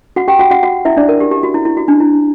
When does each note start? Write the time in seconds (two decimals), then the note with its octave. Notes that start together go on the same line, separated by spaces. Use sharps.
0.16 F#4 F#5
0.28 G4 G5
0.39 F#4 F#5
0.50 F#4 F#5
0.63 F#4 F#5
0.85 E4 E5
0.97 D4 D5
1.09 A#4
1.20 G4
1.31 G4
1.43 F#4
1.54 E4
1.65 E4
1.77 F#4
1.88 D4
2.00 E4